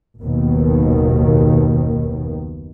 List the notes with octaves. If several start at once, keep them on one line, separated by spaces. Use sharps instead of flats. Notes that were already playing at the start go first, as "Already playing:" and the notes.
F#1 D#2 B2 D#3